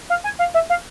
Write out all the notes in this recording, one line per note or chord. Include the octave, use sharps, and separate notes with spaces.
F5
G#5
F5
E5
F5